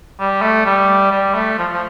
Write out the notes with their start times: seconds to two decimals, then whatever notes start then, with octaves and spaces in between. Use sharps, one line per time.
0.19 G3
0.42 A3
0.65 G3
1.12 G3
1.35 A3
1.58 F3
1.73 F3